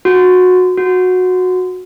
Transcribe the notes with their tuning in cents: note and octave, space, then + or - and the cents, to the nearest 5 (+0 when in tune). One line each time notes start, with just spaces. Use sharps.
F#4 -20
F#4 -15